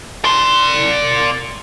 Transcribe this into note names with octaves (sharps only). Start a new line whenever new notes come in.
D5 C6